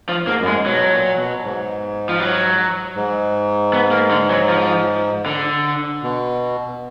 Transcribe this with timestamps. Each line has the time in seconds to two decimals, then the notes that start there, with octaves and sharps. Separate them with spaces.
0.09 F3
0.27 G#2 A#3
0.40 F#2
0.47 G#3
0.51 G#2
0.66 B2 F#3
0.92 A#2
1.17 B2
1.43 G#2
2.09 F3
2.20 F#3
2.95 G#2
3.73 B3
3.91 A#3
4.11 D3
4.31 F#3
4.49 F3
5.26 D3
6.02 B2